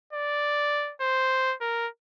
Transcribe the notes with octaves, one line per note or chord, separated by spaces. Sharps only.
D5
C5
A#4